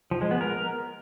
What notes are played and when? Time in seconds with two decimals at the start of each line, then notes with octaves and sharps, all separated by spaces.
0.11 F3
0.21 G#3
0.31 B3
0.41 A#4